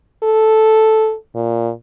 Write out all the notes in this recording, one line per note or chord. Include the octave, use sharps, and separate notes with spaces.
A4
A#2